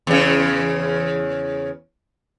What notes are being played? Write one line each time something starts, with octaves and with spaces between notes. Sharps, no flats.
E2 C#3